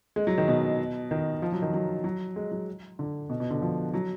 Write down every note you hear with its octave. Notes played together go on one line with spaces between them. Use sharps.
G#3
F#3
D#3
B2
D#3
F3
F#3
D#3
F#3
F#3
G#3
F#3
D3
B2
B2
D3
F3
F#3